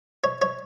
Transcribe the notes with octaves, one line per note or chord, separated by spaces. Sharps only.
C#5
C#5